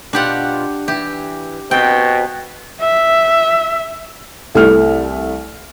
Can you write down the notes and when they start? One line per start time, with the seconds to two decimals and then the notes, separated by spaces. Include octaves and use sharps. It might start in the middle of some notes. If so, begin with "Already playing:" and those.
0.13 B2 D4 F4 G4 F#5
0.88 E3 G4
1.71 B2 C4 B4 G5
2.81 E5
4.55 C2 A3 E4 F6